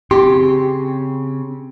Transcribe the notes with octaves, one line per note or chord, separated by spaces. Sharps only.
C#3 C4 G4 C6